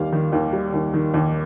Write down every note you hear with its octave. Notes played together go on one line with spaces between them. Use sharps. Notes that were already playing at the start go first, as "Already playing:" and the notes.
Already playing: D#2 G3 F5
D#3
D#2
G3
D#2
D#3
D#2